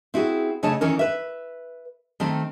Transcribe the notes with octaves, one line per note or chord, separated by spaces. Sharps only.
C4 E4 F#4 G#4
C#3 A3 C#5 D#5 A5
D#3 E3 C#4 D#4 A#4
B4 E5
D#3 A3 C4